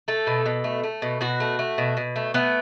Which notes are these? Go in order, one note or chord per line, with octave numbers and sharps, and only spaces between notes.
A3 A4
B2
B2
A3
A3
B2
B2 F#4
A3
A3
B2
B2
A3
A3 B3